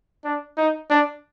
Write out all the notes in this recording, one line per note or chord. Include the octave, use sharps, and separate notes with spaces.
D4
D#4
D4